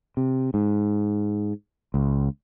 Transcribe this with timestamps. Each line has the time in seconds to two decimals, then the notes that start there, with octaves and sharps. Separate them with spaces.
0.17 C3
0.54 G#2
1.94 C#2